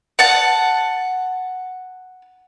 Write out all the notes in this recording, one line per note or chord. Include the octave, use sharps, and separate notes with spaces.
F#5 A5